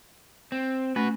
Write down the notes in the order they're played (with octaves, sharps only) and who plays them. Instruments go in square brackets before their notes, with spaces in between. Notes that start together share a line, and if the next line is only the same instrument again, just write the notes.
[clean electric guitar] C4
[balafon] A3 C#4 [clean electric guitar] F#4 B4